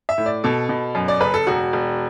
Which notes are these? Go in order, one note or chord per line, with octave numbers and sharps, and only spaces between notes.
E5
A2
D5
B2 A4
B2
F#2
D5
F#1 B4
A4
E1 F#4
E1